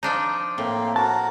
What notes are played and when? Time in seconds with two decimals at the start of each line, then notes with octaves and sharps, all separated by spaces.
0.03 F3 D4 D#4
0.58 A2 A#3 C4
0.96 F#4 A#4 A5